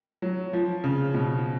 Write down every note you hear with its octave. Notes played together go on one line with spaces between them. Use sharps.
F#3
F3
C#3
B2